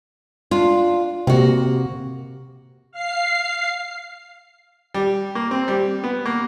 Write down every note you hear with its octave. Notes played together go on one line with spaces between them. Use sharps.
D4 F4
C3 A#3 F#4
F5 C7
G3
A#3
C4
G3
B3
A#3